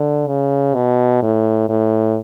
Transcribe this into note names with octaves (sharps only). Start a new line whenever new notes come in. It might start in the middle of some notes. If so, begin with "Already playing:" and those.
Already playing: D3
C#3
B2
A2
A2